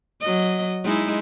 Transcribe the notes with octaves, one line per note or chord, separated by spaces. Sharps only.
F#3 D#5
G#3 D#4 E4